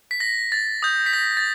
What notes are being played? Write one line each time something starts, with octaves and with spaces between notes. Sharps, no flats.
B6
A#6
A6
D#6 G6
B6
A#6
A6